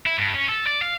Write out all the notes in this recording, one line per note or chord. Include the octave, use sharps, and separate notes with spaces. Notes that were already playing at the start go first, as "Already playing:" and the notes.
E4
G2
C#4
A4
D5
F5